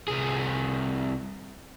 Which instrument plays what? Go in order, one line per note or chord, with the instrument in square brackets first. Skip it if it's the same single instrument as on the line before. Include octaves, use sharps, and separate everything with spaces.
[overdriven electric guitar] C2 G#4